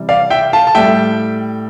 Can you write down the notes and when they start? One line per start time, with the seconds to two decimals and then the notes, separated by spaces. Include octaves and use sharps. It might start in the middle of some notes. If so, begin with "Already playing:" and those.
Already playing: C3 E3 G3
0.09 D5 F5
0.30 E5 G5
0.53 F5 A5
0.67 A5
0.75 A2 G3 E5 G5